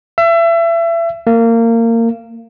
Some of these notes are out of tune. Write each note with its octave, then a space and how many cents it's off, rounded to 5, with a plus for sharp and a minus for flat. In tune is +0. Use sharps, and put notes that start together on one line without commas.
E5 +30
A#3 -25